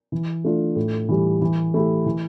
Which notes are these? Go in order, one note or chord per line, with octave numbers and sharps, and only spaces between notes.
E3
A3 D4 F4
A2
E3 G3
E3
A3 E4 G4
E3